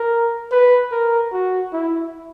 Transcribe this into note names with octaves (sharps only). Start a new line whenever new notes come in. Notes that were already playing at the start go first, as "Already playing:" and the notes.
Already playing: A#4
B4
A#4
F#4
E4